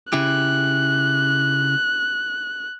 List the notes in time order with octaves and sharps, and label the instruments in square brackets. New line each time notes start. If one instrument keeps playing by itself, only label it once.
[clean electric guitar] C#3 E4 G4 [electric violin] F#6